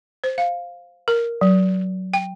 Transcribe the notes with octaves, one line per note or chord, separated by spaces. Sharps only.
C5
F5
A#4
F#3
G5